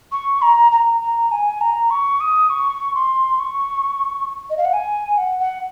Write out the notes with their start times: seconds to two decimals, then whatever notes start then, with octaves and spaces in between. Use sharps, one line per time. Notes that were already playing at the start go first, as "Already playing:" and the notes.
0.12 C#6
0.42 A#5
0.72 A#5
1.02 A#5
1.32 G#5
1.61 A#5
1.91 C#6
2.21 D#6
2.50 C#6
2.95 C6
3.40 C#6
4.50 D#5
4.58 F5
4.65 F#5
4.73 G#5
5.18 F#5
5.40 F#5